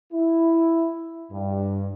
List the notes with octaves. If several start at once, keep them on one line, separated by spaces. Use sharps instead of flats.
E4
G2